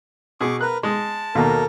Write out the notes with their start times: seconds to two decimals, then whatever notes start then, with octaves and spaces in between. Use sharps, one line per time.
0.41 B2 G#4 C#6 D6
0.61 A#4 B4 F#6
0.83 G#3 A5
1.35 D#2 B2 A#3 A4 A#4